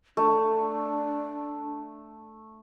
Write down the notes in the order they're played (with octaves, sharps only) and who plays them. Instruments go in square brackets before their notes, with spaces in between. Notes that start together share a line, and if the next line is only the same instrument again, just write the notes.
[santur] A3 [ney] D4